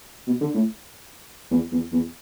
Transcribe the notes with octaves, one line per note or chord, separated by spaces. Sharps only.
B2
D3
A2
E2
E2
E2